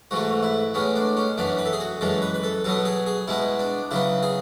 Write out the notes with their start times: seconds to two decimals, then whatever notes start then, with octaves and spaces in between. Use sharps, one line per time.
0.11 G#2 E3 A3 F#4
0.43 E4
0.74 A2 G#3 B3 C#4
0.96 D4
1.17 C#4
1.38 F#2 E3 B3 D4
1.58 B4
1.65 A4
1.73 G#4
1.80 F#4
2.01 F#2 E3 G#3 A4
2.22 B4
2.34 B4
2.43 A4
2.64 B2 F#3 B3 A4
2.85 G#4
3.06 G#4
3.28 B2 G#3 B3 E4
3.59 D4
3.91 C#3 F#3 B3 E4
4.23 G#4